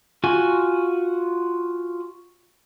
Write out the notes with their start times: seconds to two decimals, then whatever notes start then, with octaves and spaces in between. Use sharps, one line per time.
0.24 F4 F#4 G#5